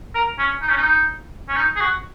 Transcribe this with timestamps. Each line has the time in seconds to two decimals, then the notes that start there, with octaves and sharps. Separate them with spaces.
0.15 A#4
0.38 C#4
0.62 D#4
0.70 C#4
0.77 D#4
1.48 C#4
1.56 D#4
1.76 G#4
1.80 F#4